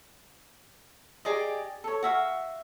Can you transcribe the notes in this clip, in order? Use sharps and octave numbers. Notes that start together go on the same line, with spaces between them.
G4 G#4 D5 D#5
A4 C#5
F#4 E5 F5